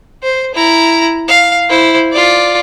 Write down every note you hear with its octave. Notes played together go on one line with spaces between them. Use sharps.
C5
E4 A#5
F5
E4 C5
F4 D5